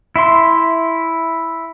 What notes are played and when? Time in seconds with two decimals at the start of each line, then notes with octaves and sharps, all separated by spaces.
0.16 E4 E5 C6